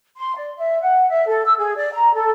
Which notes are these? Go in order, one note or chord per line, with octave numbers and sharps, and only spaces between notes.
C6
D5
E5
F#5
E5
A4
E6
G#4
D5
A#5
A4